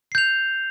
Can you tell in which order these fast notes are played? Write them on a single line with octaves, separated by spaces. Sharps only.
C7 G6 F7